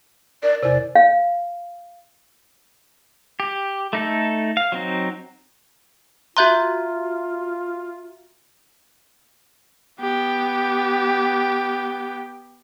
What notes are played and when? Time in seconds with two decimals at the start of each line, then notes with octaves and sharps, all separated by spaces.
0.43 A#4 D5
0.63 E2 C3 D5
0.95 F5
3.40 G4
3.93 A3 D#4 A4
4.57 F5
4.72 F#3 C4 D#4
6.37 F4 F#4 E5 A#5 C6 F#6 G6
10.00 B3 G4